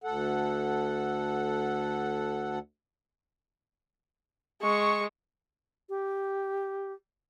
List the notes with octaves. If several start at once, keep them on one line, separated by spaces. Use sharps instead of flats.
D2 A4 F#5
G#3 C#6
G4